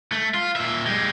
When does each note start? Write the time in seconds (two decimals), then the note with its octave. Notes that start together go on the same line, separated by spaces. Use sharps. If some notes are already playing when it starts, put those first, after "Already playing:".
0.12 A3
0.34 F4
0.56 A#2 E5
0.86 G#3 G4